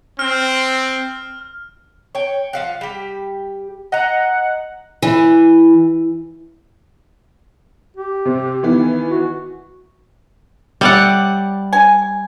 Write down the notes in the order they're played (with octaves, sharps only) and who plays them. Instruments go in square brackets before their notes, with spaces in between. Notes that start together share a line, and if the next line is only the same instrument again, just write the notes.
[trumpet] C4 [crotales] F6
[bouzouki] C#5 G5
F3 F5 F#5
G3 G4
[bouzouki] D#5 A#5 [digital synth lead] F#5
[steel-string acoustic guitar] E3
[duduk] G4
[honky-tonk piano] C3
D#3 E3 B3
[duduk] F#4
[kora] G3 D5 F#5 [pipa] C#5 E5
[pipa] G#5